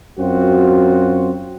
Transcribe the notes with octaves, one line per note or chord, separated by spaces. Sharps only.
F#2 C4 F4 F#4